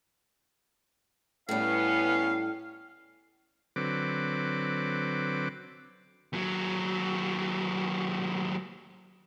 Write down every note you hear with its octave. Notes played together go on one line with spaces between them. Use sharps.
A2 G3 B3 C#4 F5
D3 F#3 C4 B4 D6
D#2 F#3